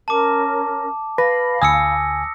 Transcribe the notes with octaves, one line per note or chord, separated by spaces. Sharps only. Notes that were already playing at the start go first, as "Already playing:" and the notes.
C#4 A#4 A5 D6
B4 F5 B5 A#6
D2 G#5 D#6 E6 C#7